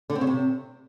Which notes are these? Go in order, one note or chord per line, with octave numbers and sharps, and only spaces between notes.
D3
C4
C#3
C3